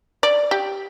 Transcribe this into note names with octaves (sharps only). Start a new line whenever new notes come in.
D5
G4